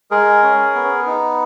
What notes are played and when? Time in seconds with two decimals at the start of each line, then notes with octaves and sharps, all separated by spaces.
0.11 G#3 G#4 A#4
0.43 C#4
0.75 B3
1.07 D#4